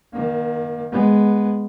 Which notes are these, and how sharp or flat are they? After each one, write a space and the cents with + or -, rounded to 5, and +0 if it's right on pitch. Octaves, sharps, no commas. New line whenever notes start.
D#3 +0 A#3 +35
G#3 +0 B3 +0